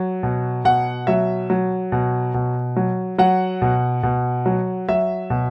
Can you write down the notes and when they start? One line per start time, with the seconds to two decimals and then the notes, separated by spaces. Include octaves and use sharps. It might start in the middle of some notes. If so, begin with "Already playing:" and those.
Already playing: F#3
0.23 B2
0.65 B2 F#5
1.07 F#3 E5
1.50 F#3
1.92 B2
2.34 B2
2.76 F#3
3.18 F#3 F#5
3.62 B2
4.03 B2
4.46 F#3
4.89 F#3 E5
5.30 B2